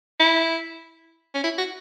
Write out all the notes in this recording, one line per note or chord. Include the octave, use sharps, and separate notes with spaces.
E4
C#4
E4
F#4